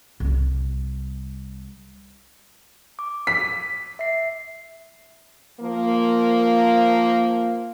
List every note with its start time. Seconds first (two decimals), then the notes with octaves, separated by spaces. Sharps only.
0.20 C2 G3
2.99 D6
3.27 B6
3.99 E5 C7
5.61 F3 A#3